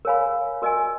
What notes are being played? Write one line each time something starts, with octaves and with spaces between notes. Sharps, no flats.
A#4 C#5 F5 G#5 B5
F#4 A#4 D#5 G#5